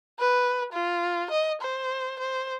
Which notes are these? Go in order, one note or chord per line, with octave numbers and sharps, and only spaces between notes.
B4
F4
D#5
C5
C5